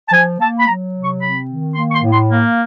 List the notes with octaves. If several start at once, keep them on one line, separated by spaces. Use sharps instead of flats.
A5
F3 G#5
A#3 A5
B5
F#3 A#5
C3
C#6
C4 B5
D#3
A#3 C6
C#6
C6
A2
C6
A#3